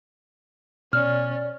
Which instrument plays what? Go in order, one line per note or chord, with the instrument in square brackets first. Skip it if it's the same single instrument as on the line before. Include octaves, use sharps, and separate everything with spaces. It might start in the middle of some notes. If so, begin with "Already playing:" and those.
[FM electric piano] B2 [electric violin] C#4 [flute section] D5 [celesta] F6